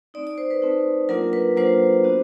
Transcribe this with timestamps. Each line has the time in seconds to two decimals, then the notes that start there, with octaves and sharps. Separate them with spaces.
0.14 A3 C4 D#4 D5
0.27 D5
0.38 C5
0.51 B4
0.62 A3 C4 D#4
1.09 F#3 A#3 D4 F4 A#4
1.33 B4
1.57 F#3 A#3 D4 F4 C5
2.04 B3 D4 F#4